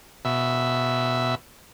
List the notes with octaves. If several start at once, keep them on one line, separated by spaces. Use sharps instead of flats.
B2 E5